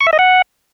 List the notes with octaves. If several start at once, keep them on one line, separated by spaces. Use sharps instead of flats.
C#6
E5
D#5
F#5